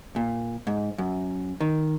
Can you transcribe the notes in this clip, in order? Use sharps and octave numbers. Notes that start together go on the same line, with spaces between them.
A#2
G#2
F#2
D#3